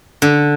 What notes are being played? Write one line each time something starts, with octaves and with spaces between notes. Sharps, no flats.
D3